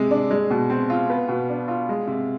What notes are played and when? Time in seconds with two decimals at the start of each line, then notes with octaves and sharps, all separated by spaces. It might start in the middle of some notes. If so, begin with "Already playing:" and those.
Already playing: C3 G#3
0.11 D4
0.31 G#3
0.51 B2
0.70 C4
0.90 F4
1.10 B3
1.29 B2
1.49 D4
1.68 F4
1.89 G#3
2.07 C3